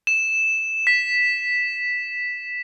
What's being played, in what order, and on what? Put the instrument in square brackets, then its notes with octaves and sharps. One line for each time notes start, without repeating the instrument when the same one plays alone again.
[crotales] E7
B6